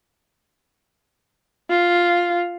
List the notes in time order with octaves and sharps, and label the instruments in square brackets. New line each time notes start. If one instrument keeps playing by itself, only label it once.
[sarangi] F4